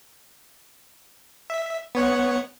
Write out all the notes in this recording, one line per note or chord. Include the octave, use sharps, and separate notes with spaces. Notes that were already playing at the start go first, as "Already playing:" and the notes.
E5
B3 C#5 F#5